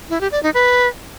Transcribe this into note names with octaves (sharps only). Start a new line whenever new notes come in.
E4
G4
D5
D#4
B4